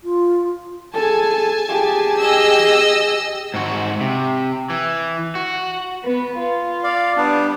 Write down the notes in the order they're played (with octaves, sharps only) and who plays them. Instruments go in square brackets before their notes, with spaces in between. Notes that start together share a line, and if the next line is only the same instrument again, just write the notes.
[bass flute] F4
[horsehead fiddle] G#4 A4 [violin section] G#5 A5
[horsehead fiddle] G4 G#4
[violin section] D#5 E6
[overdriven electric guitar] G#2 F#4
C3
E3
F#4
[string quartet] B3 B4
F4
[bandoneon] D5 F5
[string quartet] G3 [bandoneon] B3 D4